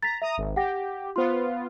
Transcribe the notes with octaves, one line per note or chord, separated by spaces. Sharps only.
A#5 A6 B6
E5 A#5 D#6
G#1
G4 F#5 G5 A#6
B3 F4 C5 C6